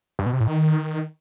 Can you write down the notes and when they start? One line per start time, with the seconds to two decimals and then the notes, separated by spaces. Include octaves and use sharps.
0.19 G2
0.26 B2
0.33 C3
0.40 A2
0.47 D#3